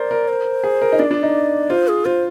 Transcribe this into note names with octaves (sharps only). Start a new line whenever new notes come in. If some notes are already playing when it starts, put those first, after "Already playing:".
Already playing: A#4 C5 D5
A#4
C5
G#4
A#4
D#4
D4 D5
D4
D#4
F4 C5
G#4
F4 C5